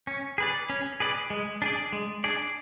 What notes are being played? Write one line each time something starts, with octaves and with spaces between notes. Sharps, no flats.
C#4
G#4 B4 D5
C#4
G#4 B4 D5
G#3
D4 G#4 D5
G#3
D4 G#4 D5